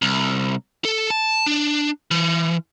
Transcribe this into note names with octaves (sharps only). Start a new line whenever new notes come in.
C2
A4
A5
D4
E3